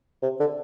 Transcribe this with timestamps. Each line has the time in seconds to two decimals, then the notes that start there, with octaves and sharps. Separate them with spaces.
0.22 C3
0.40 D3